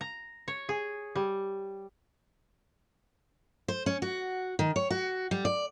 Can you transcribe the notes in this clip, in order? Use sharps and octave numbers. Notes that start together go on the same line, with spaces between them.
A#5
C#5
G#4
G3
C5
C#4
F#4
D#3
C#5
F#4
G3
D5